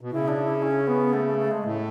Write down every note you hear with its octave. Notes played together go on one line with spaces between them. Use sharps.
B2
C#3 E4
D4
E4
C#4
B3
A3
A3
A3
G#3
A2 A3